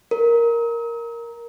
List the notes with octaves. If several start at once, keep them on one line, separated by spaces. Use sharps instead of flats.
A#4